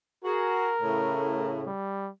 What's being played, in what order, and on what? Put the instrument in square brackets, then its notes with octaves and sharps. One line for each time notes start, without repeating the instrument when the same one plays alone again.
[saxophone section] F#4 G#4 [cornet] A#4
[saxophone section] A2 C#3
[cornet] G3